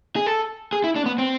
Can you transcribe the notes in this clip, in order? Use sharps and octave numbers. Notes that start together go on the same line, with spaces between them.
G#4
A4
G#4
E4
D4
B3
C4